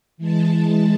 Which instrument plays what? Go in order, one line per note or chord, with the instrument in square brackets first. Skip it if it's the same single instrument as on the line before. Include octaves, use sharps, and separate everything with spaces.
[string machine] E3 G#3 A5